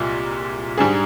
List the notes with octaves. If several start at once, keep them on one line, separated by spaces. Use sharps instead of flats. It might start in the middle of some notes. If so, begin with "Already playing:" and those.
Already playing: C2 A#2 G#3
G#2 G3 D4 G#4